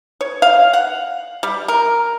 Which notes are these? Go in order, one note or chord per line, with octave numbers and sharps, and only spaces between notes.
C#5
F5
F#5
G3
A#4